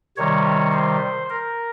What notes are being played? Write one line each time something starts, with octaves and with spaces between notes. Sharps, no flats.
C3 D#3 G3 C#5
C5
A#4